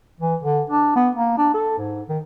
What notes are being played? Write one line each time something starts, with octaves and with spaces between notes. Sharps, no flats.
E3
D3
D4
B3
A#3
D4
A4
G#2
D#3